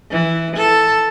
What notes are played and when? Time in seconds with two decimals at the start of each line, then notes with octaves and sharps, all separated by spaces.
0.11 E3
0.56 A4